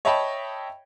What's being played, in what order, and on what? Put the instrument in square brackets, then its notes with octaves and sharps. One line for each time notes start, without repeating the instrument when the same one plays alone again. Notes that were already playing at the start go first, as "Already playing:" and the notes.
[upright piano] C#5 D#5 E5 G5 A5 B5